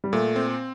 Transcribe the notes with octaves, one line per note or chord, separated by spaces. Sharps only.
G3
A#2 A3
C4